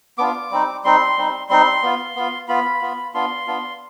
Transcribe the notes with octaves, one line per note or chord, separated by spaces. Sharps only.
B3 D4 F4 D6
G3 C4 D#4
G3 C4 D#4 C6
G3 C4 D#4
G3 C4 D#4 C6
B3 F4
B3 F4
B3 F4 B5
B3 F4
B3 D4 F4 C6
B3 D4 F4